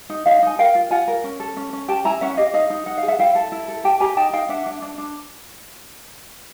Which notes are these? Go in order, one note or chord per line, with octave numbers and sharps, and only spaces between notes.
D#4
D#4 D#5 F5
D#4 G#5
A#4 F5 G5
F4
F4 F#5 G#5
A#4
C#4
A4
C#4
C#4
G4 G5 A5
E4 G#5 A#5
C#4 E5 F#5
G4 D#5 F5
D#4 D#5 F5
D#4
D#4 F#5
F5
G#4
E5 F#5
E4 F5 G5
A4
E4
A4
G4 G5 A5
G4 G#5 A#5
D#4 G5 A5
D#4 F5 G5
D4 E5 F#5
D4
D4
D4